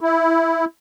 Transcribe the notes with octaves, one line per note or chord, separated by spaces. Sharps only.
E4